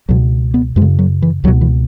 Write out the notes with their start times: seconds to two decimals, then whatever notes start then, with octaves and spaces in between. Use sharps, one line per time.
0.09 C#2 B2 F#3
0.54 B3
0.76 F#2 G#3
0.82 C#3
0.99 F#3
1.22 E3
1.44 C#2 F#3
1.48 B2
1.61 E3